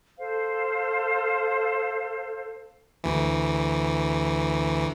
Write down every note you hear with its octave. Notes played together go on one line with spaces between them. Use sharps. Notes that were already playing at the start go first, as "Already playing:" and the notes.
A4 C5 F5
D2 E3